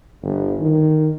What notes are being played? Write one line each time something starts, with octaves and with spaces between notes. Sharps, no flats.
G1
D#3